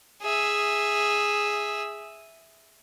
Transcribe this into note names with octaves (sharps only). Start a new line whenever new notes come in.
G#4 E5